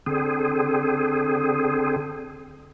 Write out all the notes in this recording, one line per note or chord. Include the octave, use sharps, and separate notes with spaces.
D3 C4 G#4